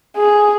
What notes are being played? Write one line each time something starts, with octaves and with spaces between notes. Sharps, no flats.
G#4